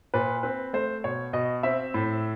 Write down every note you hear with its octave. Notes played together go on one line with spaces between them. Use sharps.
A#2 B4
C4 B4
A3 C5
B2 C#5
B2 D#5
C4 E5
A2